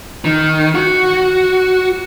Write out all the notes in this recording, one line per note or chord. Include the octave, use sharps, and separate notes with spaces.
D#3
F#4